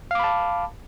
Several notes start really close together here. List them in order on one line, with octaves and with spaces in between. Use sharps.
F5 D6 B5 A5